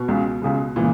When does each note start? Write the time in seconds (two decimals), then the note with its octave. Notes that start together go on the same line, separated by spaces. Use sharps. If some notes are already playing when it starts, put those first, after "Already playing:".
Already playing: B2
0.08 C#2 C#3 G#3
0.42 C#2 C#3 G#3
0.76 A#2 C#3 E3 G#3